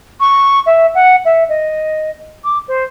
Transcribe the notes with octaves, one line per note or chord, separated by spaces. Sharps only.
C#6
E5
F#5
E5
D#5
D6
C5